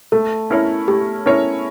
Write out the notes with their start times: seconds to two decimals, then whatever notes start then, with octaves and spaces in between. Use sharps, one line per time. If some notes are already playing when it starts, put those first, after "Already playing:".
0.12 A3 A4
0.50 C#4 E4 A#4 C#5
0.88 A3 G4
1.26 C#4 E4 A#4 C#5